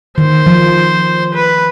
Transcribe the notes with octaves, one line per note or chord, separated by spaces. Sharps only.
D#3 C5
F3
B4